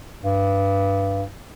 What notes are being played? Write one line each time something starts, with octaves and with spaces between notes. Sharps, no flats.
G2